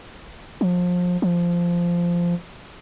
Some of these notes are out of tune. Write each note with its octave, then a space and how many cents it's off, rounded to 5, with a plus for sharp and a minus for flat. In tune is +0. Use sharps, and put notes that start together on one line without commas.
F3 +30
F3 -10